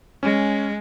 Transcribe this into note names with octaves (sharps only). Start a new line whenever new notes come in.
G#3 C#4